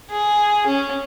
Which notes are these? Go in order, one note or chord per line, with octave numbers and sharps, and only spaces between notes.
G#4
C#4